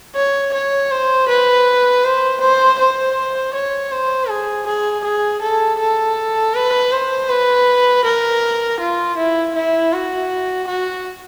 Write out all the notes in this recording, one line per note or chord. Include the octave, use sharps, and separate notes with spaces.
C#5
C#5
C5
B4
C5
C5
C5
C#5
C5
G#4
G#4
G#4
A4
A4
B4
C5
B4
A#4
F4
E4
E4
F#4
F#4